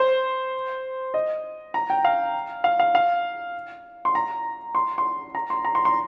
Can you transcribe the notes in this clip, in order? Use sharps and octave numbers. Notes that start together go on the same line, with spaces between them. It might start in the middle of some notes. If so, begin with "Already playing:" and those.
Already playing: C5
D#5
A#5
G5
F5
F5
F5
F5
C6
A#5
C6
C6
A#5
C6
A#5
C6
C6